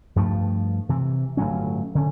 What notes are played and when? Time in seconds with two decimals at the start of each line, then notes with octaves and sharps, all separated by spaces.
0.16 G2 F3 A3
0.89 C3 E3
1.37 G1 A2 F#3 C#4
1.95 D3 C#4